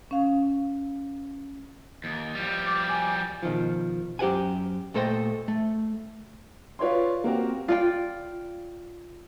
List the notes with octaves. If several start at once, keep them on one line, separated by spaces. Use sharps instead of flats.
C#4 F5
D#2
F3 G3
D6
G#5
B2 D#3 F3
F#2 G4 C5 F#5 G#5
A#2 A3 A4 C5 D#5 G5
A3
F4 B4 C#5 D5 C6
A#3 C4 F#4 G4 A#4
F4 D5 G5